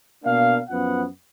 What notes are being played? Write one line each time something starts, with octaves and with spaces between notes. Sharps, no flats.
B2 A#3 D4 F5
F#2 F3 B3 F#5